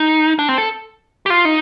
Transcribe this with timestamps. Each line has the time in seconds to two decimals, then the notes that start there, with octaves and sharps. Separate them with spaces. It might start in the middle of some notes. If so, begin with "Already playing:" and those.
Already playing: D#4
0.39 D4
0.49 C4
0.58 A4
1.26 G4
1.30 F4
1.45 D#4